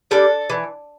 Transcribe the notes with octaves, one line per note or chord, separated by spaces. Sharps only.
G3 D4 A4
E3